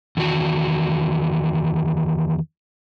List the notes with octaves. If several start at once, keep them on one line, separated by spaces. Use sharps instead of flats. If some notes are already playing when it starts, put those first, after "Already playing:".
E2 D#3 F#4